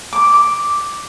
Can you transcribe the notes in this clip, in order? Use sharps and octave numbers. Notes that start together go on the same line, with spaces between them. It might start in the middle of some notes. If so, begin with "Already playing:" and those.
D6
D6